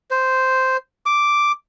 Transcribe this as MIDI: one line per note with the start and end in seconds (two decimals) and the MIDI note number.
0.11 0.77 72
1.06 1.52 86